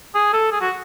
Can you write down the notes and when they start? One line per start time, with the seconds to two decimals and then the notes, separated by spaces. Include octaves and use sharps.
0.15 G#4
0.33 A4
0.52 G#4
0.61 F#4